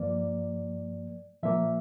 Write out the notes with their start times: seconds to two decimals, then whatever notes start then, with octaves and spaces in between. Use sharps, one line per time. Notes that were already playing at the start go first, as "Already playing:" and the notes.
Already playing: G2 F3 A#3 D5
1.43 A#2 F3 A#3 E5